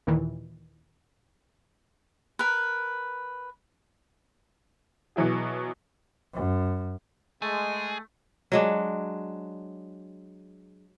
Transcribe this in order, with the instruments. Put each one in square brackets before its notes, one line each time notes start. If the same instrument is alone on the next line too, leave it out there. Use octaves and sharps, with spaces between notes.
[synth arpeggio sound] D#2 A#2 D#3 E3
[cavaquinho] A#4 B4
[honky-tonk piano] B2 E3 F#3 E4 G#4
[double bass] F#2
[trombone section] G#3 [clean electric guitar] A3 [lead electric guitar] G#4
[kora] F#3 G#3 D4